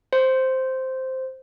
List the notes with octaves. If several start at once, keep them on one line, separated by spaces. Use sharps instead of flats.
C5